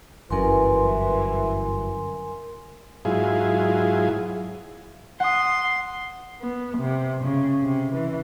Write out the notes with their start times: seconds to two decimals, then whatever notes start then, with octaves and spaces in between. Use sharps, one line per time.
0.31 G1 F#2 E3 A#4 G#5 C6
3.05 G#2 F#3 E4 F4 G#4
5.20 F#5 C6 D#6
6.41 B3
6.78 C3
7.24 C#3
7.62 C3
7.93 E3